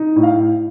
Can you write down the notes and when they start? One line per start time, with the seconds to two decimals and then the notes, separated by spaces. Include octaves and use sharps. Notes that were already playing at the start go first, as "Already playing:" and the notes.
Already playing: D#4
0.16 A2
0.23 F5